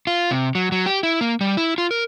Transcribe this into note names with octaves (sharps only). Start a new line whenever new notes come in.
F4
C3
F#3
F#3
G4
E4
A#3
G3
E4
F4
A#4